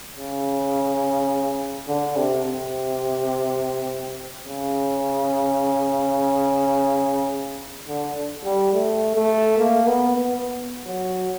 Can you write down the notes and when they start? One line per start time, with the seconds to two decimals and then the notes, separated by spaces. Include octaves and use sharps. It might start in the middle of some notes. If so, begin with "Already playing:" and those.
0.17 C#3
1.88 D3
2.16 C3
2.46 C3
4.45 C#3
7.88 D3
8.44 G3
8.73 A3
9.15 A3
9.58 A#3
9.87 B3
10.16 B3
10.86 F#3